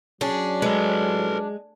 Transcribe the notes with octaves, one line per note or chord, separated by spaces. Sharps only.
F#3 C#4 D4 G#4
G#3 A4 B4